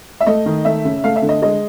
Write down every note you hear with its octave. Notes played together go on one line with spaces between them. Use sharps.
E5
A3 D#5
D#3
A3 E5
C#3
A3 F5
E5
D3
D#5
G#3 D#5